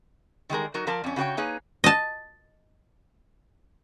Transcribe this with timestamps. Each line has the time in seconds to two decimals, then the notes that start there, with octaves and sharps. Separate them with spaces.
0.50 D#3 G3 G#3 A#4
0.74 F#3 D#4 F#4 A#4
0.87 F3 A#4 D5 A5
1.04 F2 C#4
1.16 C#3 F#4 G4 C#5 G5
1.37 A#3 D#4 G#4 B4 C#5
1.84 D#5 A5